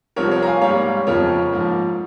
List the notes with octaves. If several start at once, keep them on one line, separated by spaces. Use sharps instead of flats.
C2 C3 F3 C4 A#4 C#5
A#4 C#5
A#5
F5 G#5
G#2 G3 A#3 C#5 F5
F2 C#3 F3 A#4 C#5
G#2 F3 A#3